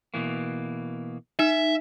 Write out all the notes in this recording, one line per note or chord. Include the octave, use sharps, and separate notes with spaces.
B2 E3 A#3
D#4 E5